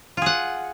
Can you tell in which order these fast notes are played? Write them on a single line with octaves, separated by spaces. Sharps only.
F4 G#4 F#5